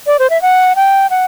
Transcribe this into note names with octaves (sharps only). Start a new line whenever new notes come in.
D5
C5
E5
F#5
G5
F#5